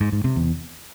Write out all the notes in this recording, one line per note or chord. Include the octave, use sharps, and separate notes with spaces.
G#2
G#2
C3
E2